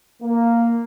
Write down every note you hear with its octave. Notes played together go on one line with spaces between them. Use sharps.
A#3